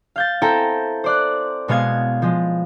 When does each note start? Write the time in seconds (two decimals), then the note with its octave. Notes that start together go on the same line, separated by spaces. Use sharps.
0.16 F5 G6 A6
0.41 C4 E4 A4 G5 G#5 A#5
1.04 C5 D5 F#6
1.68 B2 G#3 B3 F5 G#6
2.22 F3 G#3